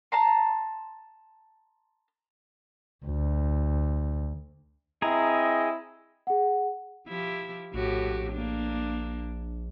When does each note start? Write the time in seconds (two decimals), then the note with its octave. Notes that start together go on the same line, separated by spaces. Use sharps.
0.12 A5 A#5 C6
3.06 D2
5.02 C4 E4 G#4 D#5 A#5
6.27 G#4 F#5
7.08 F3 E4 G4
7.74 A#1 A2 F#4 G4
8.32 A#3 D4